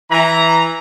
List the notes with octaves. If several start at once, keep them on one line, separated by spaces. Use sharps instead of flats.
E3 A#5